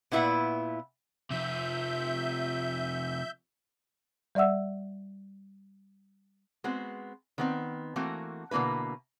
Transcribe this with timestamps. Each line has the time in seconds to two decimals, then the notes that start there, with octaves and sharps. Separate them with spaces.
0.11 A#2 B3 E4 B4 E5 F#5
1.30 C3 F3 E5 G6
4.35 G3 D5 E5 F#5 E6
6.64 G#3 B3 C4 F#4
7.38 D#3 B3 C4
7.96 E3 A3 A#3 C4 F#4
8.51 B2 D3 A#3 E4 B4